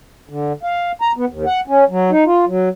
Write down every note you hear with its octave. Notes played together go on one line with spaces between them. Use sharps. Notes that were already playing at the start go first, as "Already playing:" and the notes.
D3
F5
A#5
B3
D#2
F#5
C#4
F#3
D#4
F4
F#3